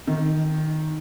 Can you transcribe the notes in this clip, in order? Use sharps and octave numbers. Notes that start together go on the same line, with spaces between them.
D#3